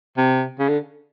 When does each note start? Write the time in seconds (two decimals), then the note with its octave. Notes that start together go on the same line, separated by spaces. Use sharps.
0.17 C3
0.60 C#3
0.69 D3